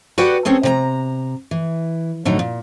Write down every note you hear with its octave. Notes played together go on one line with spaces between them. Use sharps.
F#4 G4 B4 D5 F#5 G5
C4 C#4 G#4 A4
C3 D5 A#5
E3
A2 D3 F#3 D#4
A#2